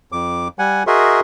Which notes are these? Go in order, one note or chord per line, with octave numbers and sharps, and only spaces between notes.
F2 D6
G3 F#5 G#5
F#4 G#4 A#4 D#5 E5 C6